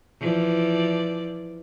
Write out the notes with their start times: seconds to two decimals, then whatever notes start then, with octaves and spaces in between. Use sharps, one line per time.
0.20 E3 F3 D5